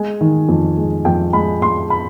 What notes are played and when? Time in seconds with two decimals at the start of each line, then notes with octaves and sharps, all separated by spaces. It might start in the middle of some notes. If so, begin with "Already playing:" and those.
Already playing: G#3 G#5
0.21 D#3
0.49 F2
0.77 G#3
1.05 F2 G5
1.33 G#3 B5
1.62 G#3 C6
1.90 B5